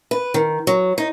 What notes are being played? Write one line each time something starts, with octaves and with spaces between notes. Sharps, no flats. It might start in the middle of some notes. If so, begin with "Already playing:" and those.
B4
D#3
F#3
D#4